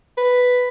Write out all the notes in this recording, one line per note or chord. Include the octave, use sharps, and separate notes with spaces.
B4